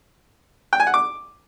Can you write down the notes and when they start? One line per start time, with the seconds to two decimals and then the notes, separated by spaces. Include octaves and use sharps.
0.73 G5
0.80 G#5
0.87 F#5
0.94 D6